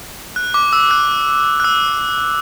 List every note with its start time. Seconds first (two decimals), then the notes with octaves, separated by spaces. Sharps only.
0.36 F#6
0.54 D6
0.73 E6
0.91 F#6
1.60 F#6
1.64 E6